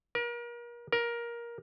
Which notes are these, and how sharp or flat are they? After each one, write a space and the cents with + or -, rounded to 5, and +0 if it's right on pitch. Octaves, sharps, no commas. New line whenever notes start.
A#4 +35
A#4 +15